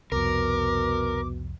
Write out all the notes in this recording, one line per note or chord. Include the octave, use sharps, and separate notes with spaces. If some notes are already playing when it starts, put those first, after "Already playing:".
C2 F2 B2 A#4 D6